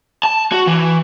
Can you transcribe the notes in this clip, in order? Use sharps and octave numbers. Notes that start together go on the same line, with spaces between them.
A5
F#4
E3